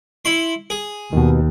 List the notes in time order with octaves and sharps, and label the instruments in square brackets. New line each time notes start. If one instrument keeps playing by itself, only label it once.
[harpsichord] E4 C6
G#4
[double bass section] D#2 [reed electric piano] B2 D#3